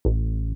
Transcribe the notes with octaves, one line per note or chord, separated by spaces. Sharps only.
A1